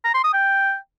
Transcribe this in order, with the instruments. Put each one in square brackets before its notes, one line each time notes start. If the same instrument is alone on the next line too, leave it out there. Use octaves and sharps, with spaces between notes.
[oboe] A#5
C6
D#6
G5